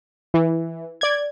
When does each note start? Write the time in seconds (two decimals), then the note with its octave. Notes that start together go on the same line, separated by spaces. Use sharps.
0.34 E3
1.01 D5 G#6